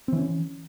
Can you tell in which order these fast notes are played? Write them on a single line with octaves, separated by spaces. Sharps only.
C4 E3 C#4